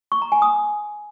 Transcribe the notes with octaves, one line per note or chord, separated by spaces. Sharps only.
C#6
A#5
G#5
D#6